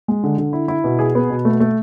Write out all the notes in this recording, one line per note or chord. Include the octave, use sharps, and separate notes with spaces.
G#3
D3
D3
E4
E4
B2
G#4
B3
B2
A3
A3